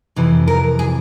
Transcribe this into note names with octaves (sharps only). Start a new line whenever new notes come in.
F2 C3 E3
A#4
G#4